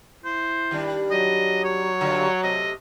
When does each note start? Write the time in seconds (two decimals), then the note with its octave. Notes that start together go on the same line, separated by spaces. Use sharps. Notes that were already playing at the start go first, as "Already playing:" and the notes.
0.24 E4 C5
0.71 D#3 G3 D4
1.11 F#3 D#5
1.64 C#5
2.01 G2 D3 F4
2.43 C3 A3 D#5